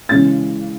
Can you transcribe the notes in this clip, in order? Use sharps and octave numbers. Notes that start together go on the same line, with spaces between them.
C#3 E3 G#3 C#4 A6